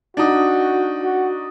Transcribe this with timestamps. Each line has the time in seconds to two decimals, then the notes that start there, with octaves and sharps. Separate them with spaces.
0.17 D4 D#4 F#4
1.02 F#4